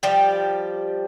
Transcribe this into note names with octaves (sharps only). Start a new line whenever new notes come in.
F3 G3 G4